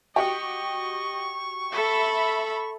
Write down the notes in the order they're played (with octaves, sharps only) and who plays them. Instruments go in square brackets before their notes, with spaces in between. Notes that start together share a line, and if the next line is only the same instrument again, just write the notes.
[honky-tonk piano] F#4 G4 [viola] D#5 [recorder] C#6
[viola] A4 [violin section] E5 B5